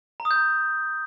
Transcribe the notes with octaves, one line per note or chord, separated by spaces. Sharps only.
A#5
D#6
G6
A#5